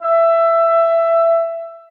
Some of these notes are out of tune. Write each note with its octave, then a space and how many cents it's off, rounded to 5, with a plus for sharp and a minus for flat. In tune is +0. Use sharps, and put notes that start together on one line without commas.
E5 +15